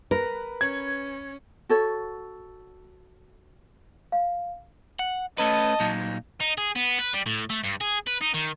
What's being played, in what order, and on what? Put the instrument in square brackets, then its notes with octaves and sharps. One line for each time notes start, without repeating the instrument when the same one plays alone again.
[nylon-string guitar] A#4 [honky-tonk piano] B4
[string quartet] C#4 [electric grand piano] G#6
[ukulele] F#4 A4 C#5
[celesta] F5
[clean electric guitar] F#5
[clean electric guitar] A3 C#4 B4 [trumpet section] D#5 A5
[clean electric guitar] A#2 F#3 D#4
[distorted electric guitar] D#4
G#4
B3
B4
G3
A2
A3
G2
G#4
B4
D#4
D#3